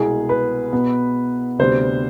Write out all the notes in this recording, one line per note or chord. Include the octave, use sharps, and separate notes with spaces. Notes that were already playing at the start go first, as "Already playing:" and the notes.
Already playing: C2 B2 G#3 B3 G#4
B4
B2 B3
D2 C3 G3 B3 C5